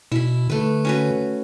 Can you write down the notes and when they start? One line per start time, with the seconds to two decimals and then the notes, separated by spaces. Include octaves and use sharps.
0.12 B2 E4 B5
0.50 D3 A3 B4
0.85 C#4 F#4 B4